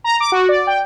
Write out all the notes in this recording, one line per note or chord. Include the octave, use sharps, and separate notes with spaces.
A#5
D6
F#4
D5
G5